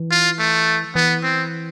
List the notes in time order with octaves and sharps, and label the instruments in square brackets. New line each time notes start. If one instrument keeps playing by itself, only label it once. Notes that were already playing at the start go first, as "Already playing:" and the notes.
Already playing: [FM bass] E3
[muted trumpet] F4
A3
[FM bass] E3 [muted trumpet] B3
[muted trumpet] C4